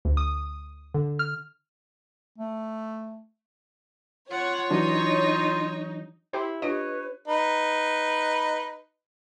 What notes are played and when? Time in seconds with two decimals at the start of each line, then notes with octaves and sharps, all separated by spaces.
0.05 D2
0.17 D#6
0.94 D3
1.19 F6
2.38 A3
4.31 F4 C#5 F#5
4.70 E3 F#3 D4 D#4
6.33 E4 G4 C5
6.62 D4 F4 G4 B4 C#5 D#5
7.28 D#4 B4